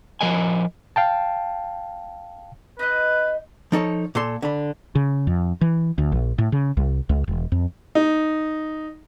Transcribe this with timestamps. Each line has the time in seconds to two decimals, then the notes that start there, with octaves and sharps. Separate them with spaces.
0.21 F3 A#4 D#5 G#5
0.96 F5 G5 A5
2.79 D#4 B4 D#5
3.72 F3 D#4 A4 C#5
4.15 A#2 A4 C6
4.42 D3 B5
4.95 C#3
5.27 F2
5.61 E3
5.98 D2
6.12 A#1
6.38 A2
6.52 C#3
6.77 C2
7.09 C#2
7.28 E1
7.52 F2
7.95 D#4